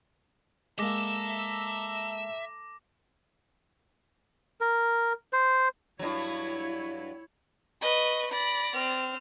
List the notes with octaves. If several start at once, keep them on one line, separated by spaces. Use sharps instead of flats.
G#3 A#3 A4 E5 A#5 D6 A#6
A#4
C5
G2 F#3 E4 C#5
B4 D#5 C#6
D5 B5 A#6
C4 F6